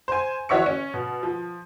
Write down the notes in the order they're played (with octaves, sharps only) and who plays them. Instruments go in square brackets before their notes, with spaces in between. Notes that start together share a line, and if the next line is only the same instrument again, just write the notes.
[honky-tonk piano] C5 G#5
E3 F#4 C#5 E5 C#6 C#7
C#4
B2
F3